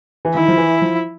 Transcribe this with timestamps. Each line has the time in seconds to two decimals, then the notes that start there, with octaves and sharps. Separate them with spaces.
0.25 E3
0.34 D#3 E4
0.48 F3
0.58 E3
0.82 F3